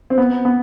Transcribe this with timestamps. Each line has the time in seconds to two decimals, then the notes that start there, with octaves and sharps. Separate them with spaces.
0.10 C4
0.18 B3
0.45 B3